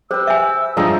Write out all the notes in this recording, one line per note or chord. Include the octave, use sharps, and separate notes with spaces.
G4 B4 C5 E6
E5 G#5
G2 F3 G#3 E5 A#5 D#6